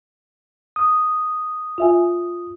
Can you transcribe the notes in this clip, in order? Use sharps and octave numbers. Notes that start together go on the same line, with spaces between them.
D#6
F4 E5 G#5